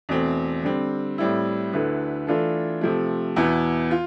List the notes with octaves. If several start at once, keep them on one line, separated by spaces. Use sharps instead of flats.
E2 B2 A3 C4
D3 G3 C4
A2 G3 C4 E4
D2 D3 A3 E4 B4
E3 A3 D4 F4 A4
C3 F3 A3
E2 B2 B3 E4
F4